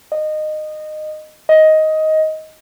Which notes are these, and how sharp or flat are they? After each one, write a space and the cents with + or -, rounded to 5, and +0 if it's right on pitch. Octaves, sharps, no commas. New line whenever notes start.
D#5 -20
D#5 +10